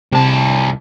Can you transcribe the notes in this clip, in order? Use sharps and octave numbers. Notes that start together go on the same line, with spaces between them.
C2 C3 A5